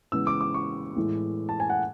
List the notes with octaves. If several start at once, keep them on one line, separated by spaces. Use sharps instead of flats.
C#3 E3 G#3 B3 E6
D6
D6
C#6
A2 E3 G#3 B3
A5
G#5
F#5